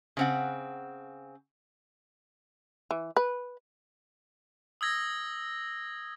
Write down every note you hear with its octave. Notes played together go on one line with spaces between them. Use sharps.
C#3 C4 F#5
E3
B4
D#6 E6 G#6 A#6